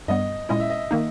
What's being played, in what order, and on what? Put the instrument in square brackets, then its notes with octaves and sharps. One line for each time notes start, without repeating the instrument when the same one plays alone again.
[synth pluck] G2 G3 B3 [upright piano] D#5
[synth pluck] A#2 G#3 C#4 E4 [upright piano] D#5
[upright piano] E5
D#5
[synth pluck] D#3 A#3 D#4